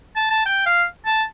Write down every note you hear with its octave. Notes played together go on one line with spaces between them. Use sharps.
A5
A5
G5
F5
A5